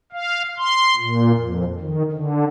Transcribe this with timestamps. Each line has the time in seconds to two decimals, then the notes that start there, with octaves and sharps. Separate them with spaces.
0.12 F5
0.58 C6
0.97 A#2
1.38 F2
1.80 D#3
2.12 D3